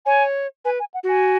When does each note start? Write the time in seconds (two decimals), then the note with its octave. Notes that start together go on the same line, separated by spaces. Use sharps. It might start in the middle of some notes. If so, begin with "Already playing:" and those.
0.06 C#5 G#5
0.65 B4 G#5
0.80 G#5
0.94 F#5
1.04 F#4 G#5